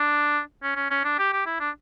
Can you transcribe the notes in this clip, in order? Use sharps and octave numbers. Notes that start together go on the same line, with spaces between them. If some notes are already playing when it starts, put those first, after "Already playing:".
Already playing: D4
C#4
C#4
C#4
D4
G4
G4
E4
D4